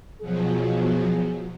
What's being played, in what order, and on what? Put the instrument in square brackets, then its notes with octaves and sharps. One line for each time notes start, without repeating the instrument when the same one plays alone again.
[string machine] B2 F3 F#3 [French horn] G#4